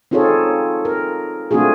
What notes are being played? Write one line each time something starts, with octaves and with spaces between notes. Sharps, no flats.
C4 D#4 F4 G#4 A4 C#5
A#4
A3 C4 D4 F4 F#4 G#4